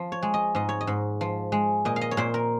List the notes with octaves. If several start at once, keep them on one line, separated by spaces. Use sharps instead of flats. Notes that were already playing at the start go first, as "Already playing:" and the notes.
Already playing: F3
C#5
G#3
D#5
G#2 D#5
C#5
D#5
G#2
F3
G#3
A#2 D#5
F5
D#5
C#5
A#2 C5
A#4